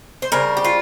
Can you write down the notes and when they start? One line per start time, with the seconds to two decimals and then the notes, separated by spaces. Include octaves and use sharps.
0.22 C5
0.32 C#3 G3 C4 A#4
0.57 G4
0.65 F4